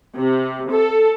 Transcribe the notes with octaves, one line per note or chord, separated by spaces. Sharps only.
C3
A4